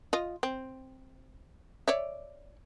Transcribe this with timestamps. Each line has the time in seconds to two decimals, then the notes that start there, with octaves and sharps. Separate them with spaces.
0.13 F4 D#5
0.43 C4
1.88 C#5 D5 E5